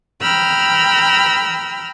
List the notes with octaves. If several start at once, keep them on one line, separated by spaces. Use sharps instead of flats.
G5 A#5 B5 E6 F6